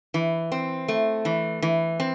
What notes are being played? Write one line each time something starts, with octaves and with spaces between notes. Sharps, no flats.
E3
C4
A3
E3
E3
C4